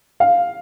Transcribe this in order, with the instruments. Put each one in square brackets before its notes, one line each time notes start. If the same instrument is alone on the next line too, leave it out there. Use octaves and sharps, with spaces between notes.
[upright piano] F5